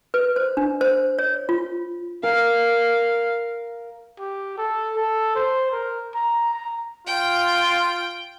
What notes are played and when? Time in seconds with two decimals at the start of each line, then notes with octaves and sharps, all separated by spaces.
0.14 B4
0.36 C5
0.57 D4
0.81 C5
1.19 C#5
1.49 F4
2.23 A#4 F5
4.19 G4
4.58 A4
4.96 A4
5.36 C5
5.72 A#4
6.14 A#5
6.54 A#5
7.07 F4 G5